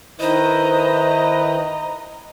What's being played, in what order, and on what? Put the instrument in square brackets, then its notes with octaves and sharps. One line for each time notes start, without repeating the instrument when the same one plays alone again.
[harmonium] D#3 E4 B4 [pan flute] C5 [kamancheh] D#5 A#5